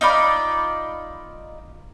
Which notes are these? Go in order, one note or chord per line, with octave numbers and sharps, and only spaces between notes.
D#4 F4 D5 B5